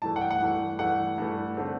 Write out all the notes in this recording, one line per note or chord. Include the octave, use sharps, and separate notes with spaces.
G2 E3 A3 A5
F#5
G5
F#5
G2 E3 A3
G2 E3 A3 F#5
G2 E3 A3
D3 A3 C4